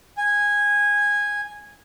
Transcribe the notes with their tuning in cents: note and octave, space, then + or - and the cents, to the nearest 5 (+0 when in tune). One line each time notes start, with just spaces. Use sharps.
G#5 -10